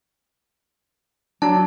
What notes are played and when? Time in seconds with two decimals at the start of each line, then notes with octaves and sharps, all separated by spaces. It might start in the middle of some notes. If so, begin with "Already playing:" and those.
1.42 F#3 D4 A5